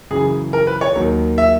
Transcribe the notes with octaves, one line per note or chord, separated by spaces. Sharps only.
F#2 C#3 E3 G#4
A#4
B4
C#5
D#2 D#3 F#3
E5